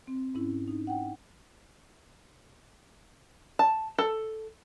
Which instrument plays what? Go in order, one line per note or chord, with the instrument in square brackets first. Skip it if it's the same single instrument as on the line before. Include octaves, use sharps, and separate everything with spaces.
[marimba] C4
G#2 C#4 E4
D#4
F#5 G5
[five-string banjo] A5
A4